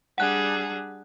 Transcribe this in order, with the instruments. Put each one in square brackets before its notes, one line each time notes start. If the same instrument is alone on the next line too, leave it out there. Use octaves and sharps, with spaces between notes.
[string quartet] G3 D4 G#4 [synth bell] F#5 F#6